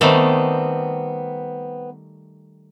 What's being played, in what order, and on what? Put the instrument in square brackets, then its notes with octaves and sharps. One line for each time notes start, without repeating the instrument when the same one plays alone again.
[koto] D#3 G3 A3 [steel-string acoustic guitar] B3 C4